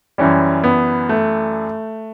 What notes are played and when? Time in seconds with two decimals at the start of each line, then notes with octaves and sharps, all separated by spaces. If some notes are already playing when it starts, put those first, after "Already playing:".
0.18 F#2 E3 G3 C#4
0.64 B3
1.09 A3